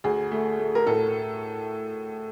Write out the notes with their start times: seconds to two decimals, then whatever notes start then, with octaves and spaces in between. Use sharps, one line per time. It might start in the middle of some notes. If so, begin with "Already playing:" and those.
0.04 D2 G#4
0.32 A3
0.59 A3
0.75 A#4
0.87 A2 A4